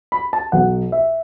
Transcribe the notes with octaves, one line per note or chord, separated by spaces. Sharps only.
B5
A5
B1 B2 B3 F#5
E5